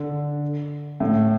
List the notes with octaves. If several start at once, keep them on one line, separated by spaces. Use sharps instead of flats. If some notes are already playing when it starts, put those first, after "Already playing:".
Already playing: D3
A2